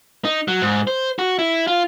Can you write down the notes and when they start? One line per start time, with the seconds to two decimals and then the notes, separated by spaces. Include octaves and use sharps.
0.25 D#4
0.48 F#3
0.62 G#2
0.87 C5
1.19 F#4
1.39 E4
1.67 F4